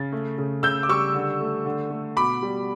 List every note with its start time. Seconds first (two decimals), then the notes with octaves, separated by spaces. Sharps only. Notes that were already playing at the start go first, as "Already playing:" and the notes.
Already playing: C#3 A6
0.12 A3
0.38 C#3
0.63 C#3 E6 G6
0.83 D6
0.89 G3 C#6 E6
1.14 D3
1.41 A3
1.66 D3
1.91 A3
2.16 B2 B5 D6
2.43 G3